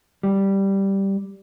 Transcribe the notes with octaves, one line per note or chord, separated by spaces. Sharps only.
G3